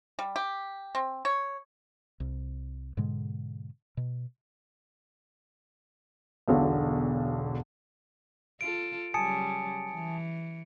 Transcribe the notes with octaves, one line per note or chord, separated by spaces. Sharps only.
G3
G4
C4
C#5
C2
G#2 B2 D3 G#3
B2
E1 B1 D3
F4 A4 D7
C#3 F#3 G3 G#5 A5 D#6 C#7
E3